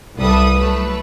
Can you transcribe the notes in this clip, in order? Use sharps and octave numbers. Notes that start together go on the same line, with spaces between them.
C2 G3 A4 B4 E5 D#6
F#3 A3 B4